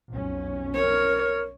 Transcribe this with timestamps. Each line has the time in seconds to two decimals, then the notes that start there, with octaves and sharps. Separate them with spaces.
0.12 B1 F2 C#4
0.74 A#4 C#5